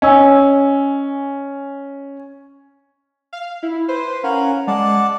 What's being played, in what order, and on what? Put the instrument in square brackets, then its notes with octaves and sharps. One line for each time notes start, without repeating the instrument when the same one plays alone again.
[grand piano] C#4 [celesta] D#5 G#5 E6
[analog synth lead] F5
E4
[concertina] B4 [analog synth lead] C5
[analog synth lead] C#4 [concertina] A#4 F5 F#5
[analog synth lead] G#3 [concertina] D5 F#5 A5